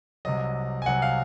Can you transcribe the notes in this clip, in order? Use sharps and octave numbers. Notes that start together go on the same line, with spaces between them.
C2 C3 F#3 D#5
G#5
C2 C3 F#3 F#5
F5